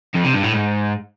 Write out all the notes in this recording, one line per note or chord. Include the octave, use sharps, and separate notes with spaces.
F2
C3
G2
A2
G#2